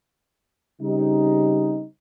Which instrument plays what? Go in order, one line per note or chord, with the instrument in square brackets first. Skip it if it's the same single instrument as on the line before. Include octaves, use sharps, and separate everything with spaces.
[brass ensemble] C#3 G3 C4 D#4